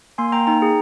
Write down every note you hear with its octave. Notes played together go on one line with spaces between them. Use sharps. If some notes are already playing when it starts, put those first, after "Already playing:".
A#3 G#5 C6
A#3 G5 A#5
D#4 G5 A#5
G#4